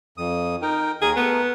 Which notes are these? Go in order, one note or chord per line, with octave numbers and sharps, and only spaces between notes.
F2 D#6
D#4 A#4 G5
D#2 D#3 G#4 A#4
A3 B3 A#4